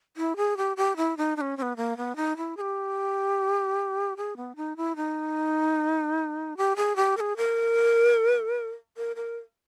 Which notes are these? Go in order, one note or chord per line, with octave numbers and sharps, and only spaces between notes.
E4
G#4
G4
G4
E4
D#4
D#4
C#4
C#4
B3
A#3
B3
D#4
E4
G#4
G4
G#4
B3
D#4
E4
D#4
G4
G#4
G4
A#4
G#4
A#4
A#4
A#4